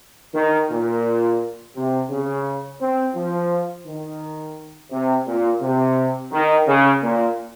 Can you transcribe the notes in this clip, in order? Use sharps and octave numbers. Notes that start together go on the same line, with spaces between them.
D#3
A#2
C3
C#3
C4
F3
D#3
C3
A#2
C3
D#3
C#3
A#2